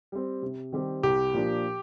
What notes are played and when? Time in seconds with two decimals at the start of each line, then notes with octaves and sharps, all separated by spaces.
0.12 G3 C4
0.42 C3
0.72 D#3 G3 C4 G4
1.03 C2 G4
1.33 A#2 F3 A#3 D4